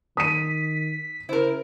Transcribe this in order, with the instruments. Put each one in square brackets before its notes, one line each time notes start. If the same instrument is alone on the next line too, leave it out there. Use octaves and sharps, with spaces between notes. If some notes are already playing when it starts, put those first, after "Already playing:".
[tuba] D#3 [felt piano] D#6 D#7 [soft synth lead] B6
[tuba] C#3 [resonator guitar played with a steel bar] E4 A#4 [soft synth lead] C5